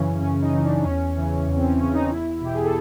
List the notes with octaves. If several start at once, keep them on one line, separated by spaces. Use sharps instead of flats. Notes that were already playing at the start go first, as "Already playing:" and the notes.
Already playing: F#2 C#3 E3 C#4
F#2 C#4
D#4
C#3 E3
D4
E2 C#4
C#3 E3
E2
C4
C#4
C#3 E3 C#4
D#4
D#4
E2 E4
B2 G4
G#4
A4